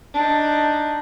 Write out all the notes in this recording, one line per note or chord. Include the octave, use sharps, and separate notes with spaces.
D4 D#4